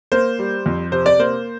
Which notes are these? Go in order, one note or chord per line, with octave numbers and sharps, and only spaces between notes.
A#3 C5
G3
F2
C3 C5
D5
A#3 C5